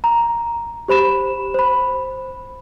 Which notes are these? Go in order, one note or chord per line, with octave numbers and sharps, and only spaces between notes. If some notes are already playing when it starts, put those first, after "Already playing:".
A#5
G4 C5 B5 E7
C5 B5